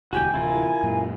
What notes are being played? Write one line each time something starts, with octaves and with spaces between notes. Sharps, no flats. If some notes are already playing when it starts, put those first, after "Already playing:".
E1 D2 F#4 G4 G5 G#5
D1 C3 E3 E4 F4 A#4
F#2 A#2